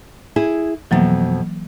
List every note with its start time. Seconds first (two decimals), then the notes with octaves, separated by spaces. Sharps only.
0.36 E4 G#4
0.91 F2 B2 E3 F#3 A#3